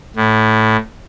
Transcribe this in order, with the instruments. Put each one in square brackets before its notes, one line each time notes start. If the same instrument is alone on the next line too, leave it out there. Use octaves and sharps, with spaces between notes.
[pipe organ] A2